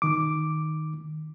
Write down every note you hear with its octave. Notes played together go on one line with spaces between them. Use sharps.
D#3 D6